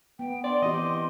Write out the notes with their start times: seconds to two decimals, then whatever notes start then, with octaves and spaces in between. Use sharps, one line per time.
0.19 B3 G5
0.44 D5 C6
0.62 E3 C4 G4 D#5